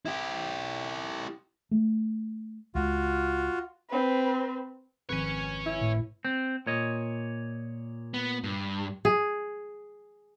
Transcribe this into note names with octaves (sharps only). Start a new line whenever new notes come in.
E4 G4
A3
C#2 F4 F#4
C4 B4
G#1 F2 B4 C#5 G#5
E4
A2
C4
A#2 C#5 D#5
B3
G2
G#4